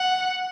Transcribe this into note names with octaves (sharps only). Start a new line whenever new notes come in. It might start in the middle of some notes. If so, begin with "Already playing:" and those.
Already playing: F#5